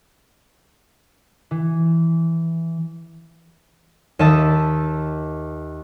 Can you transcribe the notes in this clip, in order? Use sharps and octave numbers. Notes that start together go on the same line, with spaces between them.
E3
D#2 D#5 E5 A5 E6